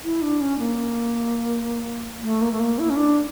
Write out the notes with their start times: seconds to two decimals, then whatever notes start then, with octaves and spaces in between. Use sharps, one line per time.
0.04 E4
0.22 D4
0.41 C#4
0.59 A#3
2.23 A3
2.42 A#3
2.52 A3
2.60 A#3
2.79 E4
2.90 C#4
2.96 D4